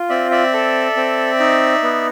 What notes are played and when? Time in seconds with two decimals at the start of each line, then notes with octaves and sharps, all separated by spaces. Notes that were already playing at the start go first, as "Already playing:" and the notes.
Already playing: F4
0.09 C4 D5 E5
0.31 D5 E5
0.53 A4
0.97 C4
1.40 D#4
1.83 B3